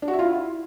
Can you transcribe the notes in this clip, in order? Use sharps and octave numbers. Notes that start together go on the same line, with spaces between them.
D4
F#4
E5
F4
E4